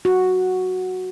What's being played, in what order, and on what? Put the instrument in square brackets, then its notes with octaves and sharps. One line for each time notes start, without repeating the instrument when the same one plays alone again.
[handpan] F#4